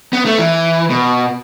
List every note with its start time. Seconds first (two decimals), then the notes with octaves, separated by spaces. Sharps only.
0.13 B3
0.26 A3
0.39 E3
0.90 B2